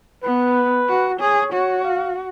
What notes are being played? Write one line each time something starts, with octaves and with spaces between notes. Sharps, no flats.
B3 B4
F#4
G#4 C#5
F#4 C#5
F5